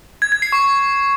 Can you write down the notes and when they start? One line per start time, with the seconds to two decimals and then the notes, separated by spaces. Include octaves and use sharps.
0.22 G#6
0.32 G#6
0.42 C7
0.52 C#6